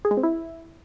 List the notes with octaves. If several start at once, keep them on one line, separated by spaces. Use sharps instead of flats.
G#4
G#3
C4
E4